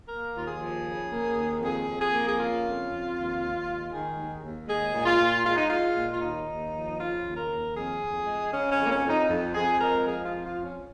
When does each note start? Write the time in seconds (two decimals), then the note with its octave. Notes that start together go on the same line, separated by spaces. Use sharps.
0.07 A#3 A#4
0.34 D#2 F4
0.46 G#4
0.59 F3
0.84 C#3
1.10 A#3
1.35 D#2
1.60 F2 G#4
1.87 F2
2.00 G#4
2.12 A#3
2.27 G#4
2.38 C#3 F4
2.63 F2
2.89 F2
3.14 D#2
3.40 D#2
3.66 G#3
3.91 D#3 G#4
4.17 D#2
4.42 D#2
4.68 G#3 G#4
4.93 A#2
5.06 F4
5.20 A#2
5.44 G#3 F4
5.56 D#4
5.68 G#3 F4
5.96 A#2
6.12 F4
6.21 D#2 D#4
6.48 D#2
6.72 F3
6.98 C#3 F4
7.24 D#2
7.36 A#4
7.50 D#2
7.75 F2 G#4
8.00 F2
8.26 G#3
8.51 C#3 C#4
8.71 C#4
8.77 F2
8.85 A#3
8.90 C#4
9.03 F2
9.09 D#4
9.28 F2
9.54 F2 G#4
9.79 G#3 A#4
10.05 F3 G#4
10.24 F4
10.31 F2
10.43 F4
10.56 F2
10.63 C#4